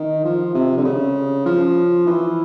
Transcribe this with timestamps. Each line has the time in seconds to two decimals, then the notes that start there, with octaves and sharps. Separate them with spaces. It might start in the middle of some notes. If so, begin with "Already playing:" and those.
Already playing: D#3
0.24 F3
0.54 C3
0.77 D3
0.84 C#3
1.46 F3
2.06 E3